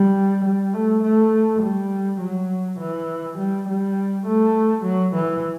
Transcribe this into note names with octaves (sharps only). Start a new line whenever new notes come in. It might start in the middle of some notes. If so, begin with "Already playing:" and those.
Already playing: G3
G3
A3
A3
G3
F#3
E3
G3
G3
A3
F#3
E3